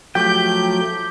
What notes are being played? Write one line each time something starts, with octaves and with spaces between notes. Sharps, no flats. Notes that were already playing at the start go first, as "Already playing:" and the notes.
F3 F#3 A3 G4 G5 G6